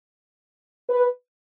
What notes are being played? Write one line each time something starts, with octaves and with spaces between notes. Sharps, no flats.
B4